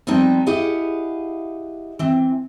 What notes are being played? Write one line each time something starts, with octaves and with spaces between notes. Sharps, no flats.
F3 G3 B3 C4 D#4
E4 G4 G#4 D#5 F5 F#5
E3 C4